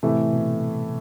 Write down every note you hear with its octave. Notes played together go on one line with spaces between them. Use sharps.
A2 C3 E3 A3
B2